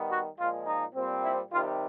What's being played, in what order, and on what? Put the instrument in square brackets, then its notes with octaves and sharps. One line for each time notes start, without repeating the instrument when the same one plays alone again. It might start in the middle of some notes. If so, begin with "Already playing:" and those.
Already playing: [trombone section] D#3 G3 B3
F#4
A#2 F3 G#3 F4
D#4
A#2 G3 C4
E4
C3 D#3 G3 F4